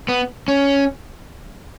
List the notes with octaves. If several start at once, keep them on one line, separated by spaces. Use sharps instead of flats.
B3
C#4